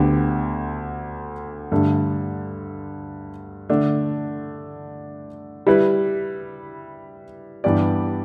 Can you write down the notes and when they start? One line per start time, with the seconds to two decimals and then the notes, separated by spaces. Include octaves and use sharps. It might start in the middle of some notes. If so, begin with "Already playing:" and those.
Already playing: D2 D3 B3 G4
1.72 G2 D3 A3
3.70 D3 A3 D4
5.67 G3 E4 B4
7.64 G2 E3 B3 G4 D5